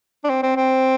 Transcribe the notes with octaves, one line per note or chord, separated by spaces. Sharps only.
D4
C4
C4
C4